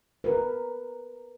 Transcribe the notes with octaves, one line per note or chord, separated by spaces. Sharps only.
A#4 B4